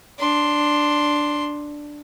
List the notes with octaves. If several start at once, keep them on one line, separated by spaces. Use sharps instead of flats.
D4 C6